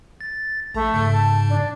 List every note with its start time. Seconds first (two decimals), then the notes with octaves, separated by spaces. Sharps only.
0.21 A6
0.74 A#1 A3
0.94 G#2 C#3
1.12 A5
1.49 D4